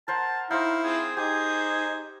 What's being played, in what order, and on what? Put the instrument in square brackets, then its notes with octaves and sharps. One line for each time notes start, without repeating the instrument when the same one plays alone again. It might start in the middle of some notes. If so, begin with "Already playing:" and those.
[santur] A#4 C5 F#5 [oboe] A5
[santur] D#4 C5 [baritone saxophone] E4 [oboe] F5
[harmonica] C4 F4 [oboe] G#4
[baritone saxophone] D#4 [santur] G4 [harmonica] C5 G#5